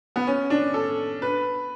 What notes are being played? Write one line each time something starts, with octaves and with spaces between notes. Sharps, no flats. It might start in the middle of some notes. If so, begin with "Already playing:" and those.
B3
C#4
D4
A4
B4